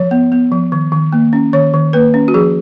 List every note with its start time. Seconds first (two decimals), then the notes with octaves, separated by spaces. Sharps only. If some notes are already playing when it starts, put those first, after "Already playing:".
Already playing: F3 C#5
0.11 B3
0.32 B3
0.52 F3
0.72 D#3
0.92 D#3
1.13 A#3
1.33 C#4
1.53 D#3 C#5
1.74 D#3
1.93 A#3 B4
2.14 C#4
2.28 F#4
2.34 F3 G#4